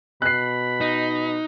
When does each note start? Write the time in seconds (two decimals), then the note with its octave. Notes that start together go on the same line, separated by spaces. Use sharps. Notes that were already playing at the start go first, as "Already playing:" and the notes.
0.22 B2 B5 F#6 C7
0.81 D#4